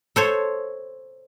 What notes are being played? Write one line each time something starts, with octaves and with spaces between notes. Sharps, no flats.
A4 C5 C#5